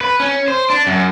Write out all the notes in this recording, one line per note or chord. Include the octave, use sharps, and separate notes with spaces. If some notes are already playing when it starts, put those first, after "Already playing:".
B4
C#4
C5
D4
F#2